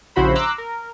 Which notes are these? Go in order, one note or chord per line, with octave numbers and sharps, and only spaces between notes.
A#1 C#3 E4 F#4 C5 B5
A#5 C6 D6 E6 F#6
A#4